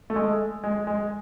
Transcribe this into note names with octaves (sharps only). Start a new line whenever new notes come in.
A3
G#3
G#3
G#3